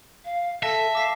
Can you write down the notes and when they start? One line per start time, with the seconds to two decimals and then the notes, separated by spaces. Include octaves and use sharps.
0.25 F5
0.63 A4 E5 A5 A#6
0.95 F5 D6 B6 C7